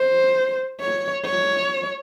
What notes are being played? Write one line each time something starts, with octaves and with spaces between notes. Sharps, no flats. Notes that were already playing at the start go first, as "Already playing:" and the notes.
Already playing: C5
C#5
C#5